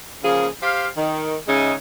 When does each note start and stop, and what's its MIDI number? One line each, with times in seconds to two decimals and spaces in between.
0.23 0.47 49
0.23 0.47 53
0.23 0.47 58
0.23 0.47 68
0.61 0.87 67
0.61 0.87 72
0.61 0.87 77
0.97 1.37 51
1.47 1.73 49
1.47 1.73 56
1.47 1.73 63
1.47 1.73 73
1.47 1.73 76